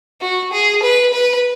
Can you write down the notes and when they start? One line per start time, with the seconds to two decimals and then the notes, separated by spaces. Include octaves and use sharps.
0.21 F#4
0.52 G#4
0.82 B4
1.13 B4